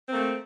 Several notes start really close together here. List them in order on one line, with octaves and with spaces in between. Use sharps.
C4 A#3 A3